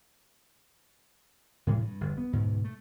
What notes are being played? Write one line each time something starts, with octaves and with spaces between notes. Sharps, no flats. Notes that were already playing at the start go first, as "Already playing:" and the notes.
A2 C3 E3 G#3
G2
G1 F2
B3
D2 G#2 B2
A3